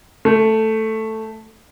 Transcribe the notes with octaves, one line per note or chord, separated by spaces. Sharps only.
A3